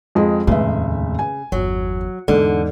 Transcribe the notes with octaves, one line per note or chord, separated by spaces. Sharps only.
F2 G#3
F1 D#2 A2 C#3 G#3 E5
G#5
G1 E2 F#3
E2 G#2 D3